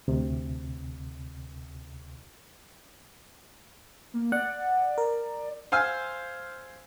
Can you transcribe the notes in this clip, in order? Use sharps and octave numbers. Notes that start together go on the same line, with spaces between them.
D2 C3
A#3
D5 F#5
A#4
C5 F5 G#5 E6 F6